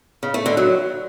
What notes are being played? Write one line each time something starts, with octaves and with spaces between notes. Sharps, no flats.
C#3
A3
D3
F#3